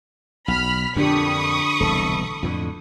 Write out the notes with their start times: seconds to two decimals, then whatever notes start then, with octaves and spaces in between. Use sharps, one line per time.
0.48 B1 B5 F6 B6
0.96 F2 A#2 D3 D4 G4 B5 C#6 D#6
1.80 E1 C2 A4
2.43 F2 A2 D3